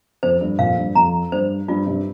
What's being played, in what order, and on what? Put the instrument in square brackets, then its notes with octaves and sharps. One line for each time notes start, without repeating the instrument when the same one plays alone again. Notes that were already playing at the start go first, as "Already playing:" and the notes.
[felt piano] F2 [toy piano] C5
[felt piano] G2
[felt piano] F2 A#2 [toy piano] F5
[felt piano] G2
[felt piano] F2 [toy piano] A#5
[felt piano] G2 [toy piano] C5
[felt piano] G2 [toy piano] F4
[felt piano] G2 C3